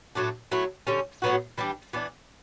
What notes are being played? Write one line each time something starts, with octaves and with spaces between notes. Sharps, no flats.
A2 F#3 A3 D4
F#3 A3 E4
D3 G3 C#4
A2 F#3 B3 F#4
E3 G3 D4 G4
E3 B3 D4